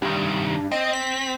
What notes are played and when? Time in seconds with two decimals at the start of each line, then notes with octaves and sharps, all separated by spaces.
0.02 C2 G2 D#3
0.71 C4 D#5
0.93 B6